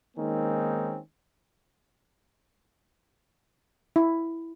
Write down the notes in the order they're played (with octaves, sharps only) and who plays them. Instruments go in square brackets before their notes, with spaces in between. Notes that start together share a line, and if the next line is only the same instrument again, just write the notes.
[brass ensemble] D#3 G#3 A#3 C4 C#4 D#4
[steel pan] E4